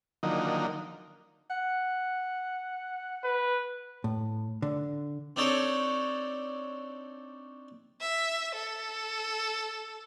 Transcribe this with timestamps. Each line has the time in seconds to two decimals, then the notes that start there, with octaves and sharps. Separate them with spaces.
0.23 D3 D#3 F3 F#3 A#3 D#4
1.50 F#5
3.24 B4
4.04 A2
4.62 D3
5.36 C4 D4 D#4 A4 C#5
8.01 E5
8.54 A4